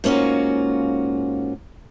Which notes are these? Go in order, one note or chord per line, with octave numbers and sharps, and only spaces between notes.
G#2 A#3 C#4 F4 F#4